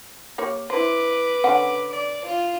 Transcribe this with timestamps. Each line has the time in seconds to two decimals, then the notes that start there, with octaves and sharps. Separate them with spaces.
0.38 A#3 G4 C#5
0.70 E4 B4 C5 D6
1.44 D3 C#4 F#5
1.90 D5
2.25 F4